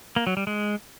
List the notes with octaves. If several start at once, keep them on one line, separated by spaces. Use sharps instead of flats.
A#3
F#3
G3
G#3